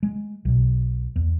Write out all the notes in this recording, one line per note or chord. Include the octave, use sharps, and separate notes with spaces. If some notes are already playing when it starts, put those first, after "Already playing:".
G#3
B1 B2
E2